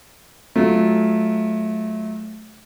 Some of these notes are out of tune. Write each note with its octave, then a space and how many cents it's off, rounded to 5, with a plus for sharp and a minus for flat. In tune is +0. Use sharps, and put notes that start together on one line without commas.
F#3 +0 A3 -20 F4 +0